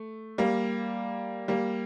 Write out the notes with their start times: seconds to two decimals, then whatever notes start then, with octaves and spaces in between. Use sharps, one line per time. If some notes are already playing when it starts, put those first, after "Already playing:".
Already playing: A3
0.38 G3 A#3
1.48 G3 A#3